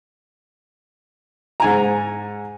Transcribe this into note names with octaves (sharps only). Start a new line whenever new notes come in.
G#2 G#5 A#5